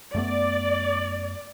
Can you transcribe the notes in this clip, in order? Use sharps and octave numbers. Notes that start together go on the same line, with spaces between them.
F#2 A3 B3 D5